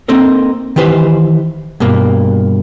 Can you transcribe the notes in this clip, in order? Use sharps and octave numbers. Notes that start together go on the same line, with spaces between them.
A#3 C4 D#4 A4 A#4
D#3 E3 G4 B4 C5
G2 B2 A#3